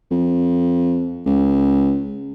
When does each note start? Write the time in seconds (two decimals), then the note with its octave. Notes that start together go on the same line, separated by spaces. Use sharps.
0.11 F2
1.26 C#2